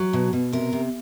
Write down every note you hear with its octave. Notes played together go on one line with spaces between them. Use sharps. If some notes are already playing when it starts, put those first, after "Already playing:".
Already playing: F#3
B2
B2
C3 A#4
C3